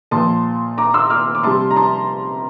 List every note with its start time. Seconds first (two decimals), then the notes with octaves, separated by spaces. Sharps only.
0.11 A#2 F3 A5 C6
0.78 A#5 D6
0.94 C6 E6
1.10 D6 F6
1.35 D6
1.43 C3 G3 A5 C6
1.70 A#5
1.76 A5 C6